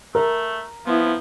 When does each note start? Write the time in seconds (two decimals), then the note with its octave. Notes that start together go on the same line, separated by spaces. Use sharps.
0.15 A3 A#4
0.86 F3 B3 E4